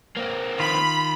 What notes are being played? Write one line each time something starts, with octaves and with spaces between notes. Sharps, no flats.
A#3 C4
D#3 F4 B5